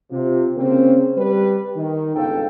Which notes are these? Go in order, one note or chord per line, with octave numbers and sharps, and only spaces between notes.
C3 F4
C#3 A#3 C4
G3 B4
D#3
G1 C#2 G#2 A4 F5 G5